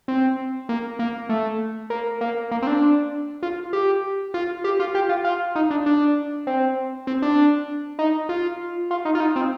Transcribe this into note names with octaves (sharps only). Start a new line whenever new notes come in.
C4
A#3
A#3
A3
A#3
A#3
A#3
C4
D4
F4
G4
F4
G4
F4
G4
F4
F4
D#4
D4
D4
C4
C4
D4
D#4
F4
F4
D#4
F4
D#4
C4